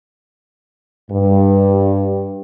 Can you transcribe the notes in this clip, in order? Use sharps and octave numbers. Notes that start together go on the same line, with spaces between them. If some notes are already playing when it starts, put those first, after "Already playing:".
G2